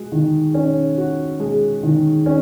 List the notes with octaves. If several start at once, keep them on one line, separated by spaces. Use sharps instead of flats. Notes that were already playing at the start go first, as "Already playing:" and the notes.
Already playing: G#3 F#4
D#3
C#4
F#4
G#3
D#3
C#4